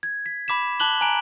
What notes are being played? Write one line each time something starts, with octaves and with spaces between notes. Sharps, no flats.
G#6
B6
B5 D6 B6 E7
A5 D6 F#6 F#7 G7
G#5 A#5 F#6 D7 F#7